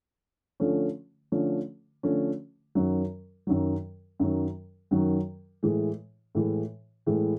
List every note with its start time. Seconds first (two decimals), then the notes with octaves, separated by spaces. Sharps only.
0.60 D3 F3 A3 C#4
1.32 D3 F3 A3 C#4
2.03 D3 F3 A3 C#4
2.75 F#2 D#3 F#3
3.47 F#2 D#3 F#3
4.20 F#2 D#3 F#3
4.91 F#2 D#3 F#3
5.63 A2 E3 G#3
6.35 A2 E3 G#3
7.06 A2 E3 G#3